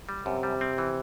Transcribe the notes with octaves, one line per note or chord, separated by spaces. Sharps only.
G3
F#2 C3
G3
C4
E3